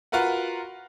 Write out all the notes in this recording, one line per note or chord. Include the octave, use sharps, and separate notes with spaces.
F4 F#4 A#4 B4 F#5